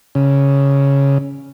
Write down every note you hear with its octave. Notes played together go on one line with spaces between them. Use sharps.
C#3